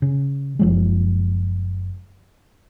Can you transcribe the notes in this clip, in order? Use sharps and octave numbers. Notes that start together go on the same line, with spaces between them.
C#3
F#1 F3 G#3